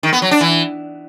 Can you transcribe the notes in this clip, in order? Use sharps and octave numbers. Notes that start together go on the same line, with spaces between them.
D#3
B3
F#3
D4
E3